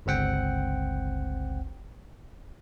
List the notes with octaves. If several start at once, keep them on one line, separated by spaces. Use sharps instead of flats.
G1 C#2 C4 F#5 G5